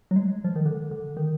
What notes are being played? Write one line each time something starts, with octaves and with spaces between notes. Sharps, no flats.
F#3
G#3
F3
D#3
D3
D3
D#3